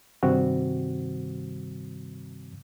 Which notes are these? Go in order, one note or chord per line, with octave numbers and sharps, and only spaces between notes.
G2 C3 D#3 G3 C4 F#4